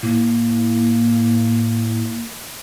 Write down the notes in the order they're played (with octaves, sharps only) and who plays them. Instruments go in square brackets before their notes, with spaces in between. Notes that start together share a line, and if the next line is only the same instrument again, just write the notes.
[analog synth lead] A2 [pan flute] A#3